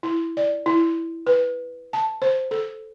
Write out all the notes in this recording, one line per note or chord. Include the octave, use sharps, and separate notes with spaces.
E4
D5
E4
B4
A5
C5
A4